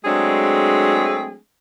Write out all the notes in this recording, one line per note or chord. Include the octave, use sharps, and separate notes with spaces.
F#3 G#3 A3 C4 D4 G#4